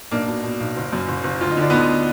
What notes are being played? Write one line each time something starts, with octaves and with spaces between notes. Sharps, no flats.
B1 A#3 D4
B2
B2
B1
F#1
F#2
F#1
F#1
D2 F4
D#4
D3 D4
D2 B3 D#4